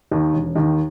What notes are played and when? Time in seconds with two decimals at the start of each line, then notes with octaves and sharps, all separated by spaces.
0.11 D#2 D#3
0.33 E1
0.55 D#2 D#3